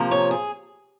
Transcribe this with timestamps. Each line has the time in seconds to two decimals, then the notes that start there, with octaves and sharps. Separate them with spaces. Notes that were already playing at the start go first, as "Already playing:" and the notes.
Already playing: C3 F3 A#3
0.11 C#5
0.31 G#4